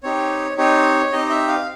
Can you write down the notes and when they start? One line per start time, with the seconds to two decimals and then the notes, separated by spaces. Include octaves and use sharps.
0.03 C4 D#4 G4 C#5
0.58 C4 D#4 G4 C#5
1.12 C4 D#4 G4 D#5
1.30 E5
1.48 F5